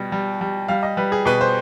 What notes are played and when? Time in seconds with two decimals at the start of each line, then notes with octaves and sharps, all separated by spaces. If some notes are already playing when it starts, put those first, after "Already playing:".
Already playing: B2 G3
0.12 G3
0.41 G3
0.68 G3 F5
0.83 D#5
0.97 G3 B4
1.12 G#4
1.25 B2 B4
1.41 C5